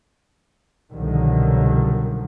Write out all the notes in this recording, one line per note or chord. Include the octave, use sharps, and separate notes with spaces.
C2 B2 D3 D#3 F3 F#3